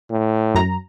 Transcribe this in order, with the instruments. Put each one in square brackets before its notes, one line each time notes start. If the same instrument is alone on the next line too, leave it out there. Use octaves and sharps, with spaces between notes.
[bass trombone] A2
[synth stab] F#2 A#5